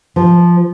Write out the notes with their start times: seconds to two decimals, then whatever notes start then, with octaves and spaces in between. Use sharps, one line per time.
0.16 F3